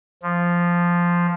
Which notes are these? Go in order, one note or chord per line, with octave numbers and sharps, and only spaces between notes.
F3